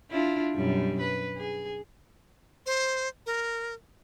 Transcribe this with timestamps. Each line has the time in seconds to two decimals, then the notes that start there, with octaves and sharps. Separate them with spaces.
0.11 D4 E4 F4
0.55 F#2 B2 G3
1.01 B4
1.37 G#4
2.66 C5
3.26 A#4